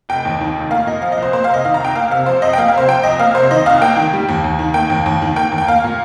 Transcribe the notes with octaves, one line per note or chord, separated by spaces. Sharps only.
F1 G5
D#2
D#3
F1
A#3 F5
A#2 D#5
F3 F5
D#5
C2
C5
A#3 C5
C3 F5
D#5
D#3 F5
A#5
C2 G5
A#3 F5
C3 F5
F3 C5
F2 D#5
G5
A#3 F5
F5
C3 C5
F3 G5
C2 D#5
A#3 F5
C3 C5
D#3 D#5
C2 F5
A#3 G5
D#3
G3
D#2
D#2
D#3
A#3 G5
D#2
D#2
D#3
A#3 G5
D#2
G5
A#3 F5
A#2